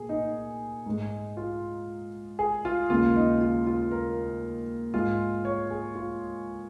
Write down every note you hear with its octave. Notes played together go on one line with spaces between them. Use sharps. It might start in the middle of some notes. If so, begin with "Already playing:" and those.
Already playing: A#2 G#4
D#4
G#2 G#3
F4
G#4
F4
D#2 C#3 G#3 F4
D#4
F4
F4
A#4
G#2 G#3 F4
C#5
G#4
F4